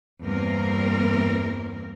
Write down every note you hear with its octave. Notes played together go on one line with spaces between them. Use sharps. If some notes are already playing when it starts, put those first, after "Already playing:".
E2 G2 A#3 C4 A#4